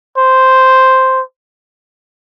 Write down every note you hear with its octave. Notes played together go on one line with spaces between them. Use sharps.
C5